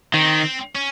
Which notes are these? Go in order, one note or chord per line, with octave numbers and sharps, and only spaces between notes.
D#3 C4
C#4